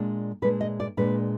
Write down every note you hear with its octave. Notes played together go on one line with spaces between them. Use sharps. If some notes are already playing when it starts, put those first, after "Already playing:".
Already playing: A#2 G#3 D4
A#2 G#3 D4 B4
D#5
D5
A#2 G#3 D4 B4